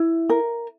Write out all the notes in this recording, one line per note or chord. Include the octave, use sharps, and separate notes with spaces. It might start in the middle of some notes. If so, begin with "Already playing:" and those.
Already playing: E4
A#4